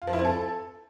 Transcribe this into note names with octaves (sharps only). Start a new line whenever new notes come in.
F4
F3
E4
C4
A4